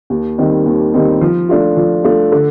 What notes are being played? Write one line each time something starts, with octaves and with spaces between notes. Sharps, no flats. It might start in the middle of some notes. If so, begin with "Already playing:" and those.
D#2
D#3 G3 C4 D#4
D#2
D#3 G3 C4 D#4
F3
A3 D4 F4
F3
A3 D4 F4
D3